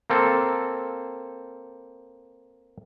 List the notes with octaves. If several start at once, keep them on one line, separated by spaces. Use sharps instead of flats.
A#3 C4 A4